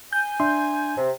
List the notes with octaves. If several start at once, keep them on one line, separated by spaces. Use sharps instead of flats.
G#5 G6
D4 E5 C6
C3